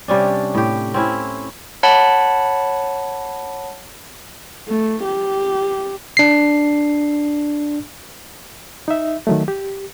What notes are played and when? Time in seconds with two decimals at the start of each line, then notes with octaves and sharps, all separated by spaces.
0.08 C3 G3 C#4 D4
0.55 A2 G4
0.94 C4 C#4 E4
1.83 C#5 F#5 A5 B5
4.68 A3
5.04 G4
6.17 D4 C7
8.88 D#4 E5
9.27 D#3 F#3 A3
9.48 G4